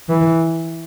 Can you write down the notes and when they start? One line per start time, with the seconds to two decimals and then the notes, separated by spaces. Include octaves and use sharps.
0.09 E3